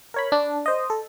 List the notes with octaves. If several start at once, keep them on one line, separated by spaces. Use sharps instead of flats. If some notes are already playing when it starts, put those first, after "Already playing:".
A#4 C#5 B5
D4
C5 D#5
A4